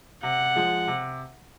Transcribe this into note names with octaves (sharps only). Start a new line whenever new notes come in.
C3 F#5
F3 G#3
C3